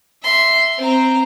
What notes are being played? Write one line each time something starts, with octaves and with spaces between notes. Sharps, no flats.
E5 C6
C4 A#5